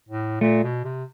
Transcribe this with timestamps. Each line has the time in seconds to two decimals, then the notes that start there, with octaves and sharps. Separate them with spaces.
0.09 A2
0.41 A#2 A3
0.63 B2
0.84 C3